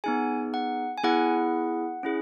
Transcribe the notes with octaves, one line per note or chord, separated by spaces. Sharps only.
B3 D#4 G#4 G#5
F#5
G#5
B3 E4 G#4 F#5
C#4 E4 G#4